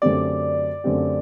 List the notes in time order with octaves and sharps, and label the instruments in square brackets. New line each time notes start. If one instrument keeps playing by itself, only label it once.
[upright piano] F#2 D3 A3 C4 G4 [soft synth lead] D5
[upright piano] F#2 D3 A3 C4 G4